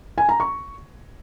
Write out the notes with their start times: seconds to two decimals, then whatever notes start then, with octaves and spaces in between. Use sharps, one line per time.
0.18 G#5
0.29 A#5
0.40 C#6